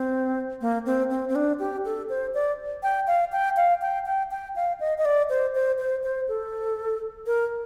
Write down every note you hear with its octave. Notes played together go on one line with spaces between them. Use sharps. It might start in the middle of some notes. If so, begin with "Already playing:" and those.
Already playing: C4
A#3
C4
C4
C4
D4
G4
A4
C5
D5
G5
F5
G5
F5
G5
G5
G5
F5
D#5
D#5
D5
C5
C5
C5
C5
A4
A#4